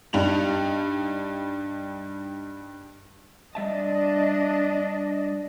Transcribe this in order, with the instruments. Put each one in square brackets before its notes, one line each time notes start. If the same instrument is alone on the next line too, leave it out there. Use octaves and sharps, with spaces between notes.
[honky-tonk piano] G2 G3 D#4 F7 F#7
[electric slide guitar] G3 E5 A5 [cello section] D4 D#5